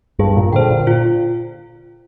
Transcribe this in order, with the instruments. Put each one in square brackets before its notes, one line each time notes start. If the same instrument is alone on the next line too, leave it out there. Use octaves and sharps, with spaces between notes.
[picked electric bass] G2 [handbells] G#4
[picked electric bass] A#2
[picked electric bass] D3 [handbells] C5 G5
[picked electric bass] A#2
[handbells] F4